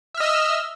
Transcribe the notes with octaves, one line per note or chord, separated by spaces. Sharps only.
D#5 E5 E6 F6